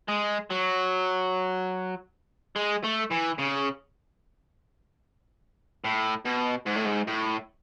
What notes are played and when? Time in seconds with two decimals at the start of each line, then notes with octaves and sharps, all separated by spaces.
0.09 G#3
0.51 F#3
2.56 G#3
2.83 A3
3.10 E3
3.38 C#3
5.84 A2
6.26 B2
6.67 G#2
6.76 A2
6.86 G#2
7.08 A2